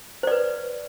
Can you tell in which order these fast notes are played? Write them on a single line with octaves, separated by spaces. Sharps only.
C5 D5 B4